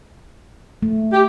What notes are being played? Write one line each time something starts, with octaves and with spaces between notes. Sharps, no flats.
A3
G4